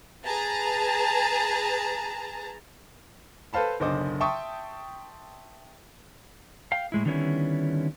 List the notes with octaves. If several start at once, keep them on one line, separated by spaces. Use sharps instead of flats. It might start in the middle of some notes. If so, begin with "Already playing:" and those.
G#4 B4 A5 A#5
A4 B4 C5 F5 A5 B5
F#1 B1 D3 C5 D#5 D6
E5 G5 A5 C6 C#6 D#6
F5 G5
A2 G#3 E4
D3 D#3 G3 B3 C#4 E4